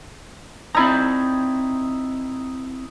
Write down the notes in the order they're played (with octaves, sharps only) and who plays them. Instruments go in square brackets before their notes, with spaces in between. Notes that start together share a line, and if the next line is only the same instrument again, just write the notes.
[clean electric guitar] C4 D5 A#5 [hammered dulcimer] D#4 E4